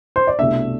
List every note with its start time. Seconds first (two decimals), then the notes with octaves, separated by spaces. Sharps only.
0.16 C5
0.27 D5
0.39 C2 B2 A3 D4 E5